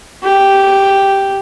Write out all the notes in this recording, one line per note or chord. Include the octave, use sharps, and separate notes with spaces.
G4